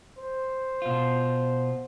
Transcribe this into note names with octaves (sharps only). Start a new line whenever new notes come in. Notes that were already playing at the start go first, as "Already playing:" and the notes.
C5
B2 F4